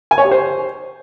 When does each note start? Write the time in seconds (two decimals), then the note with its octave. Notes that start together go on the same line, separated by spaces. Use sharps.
0.11 G#5
0.18 C#5
0.25 G4
0.31 C5